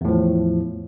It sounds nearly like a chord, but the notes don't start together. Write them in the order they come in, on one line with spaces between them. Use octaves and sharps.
E2 A2 F3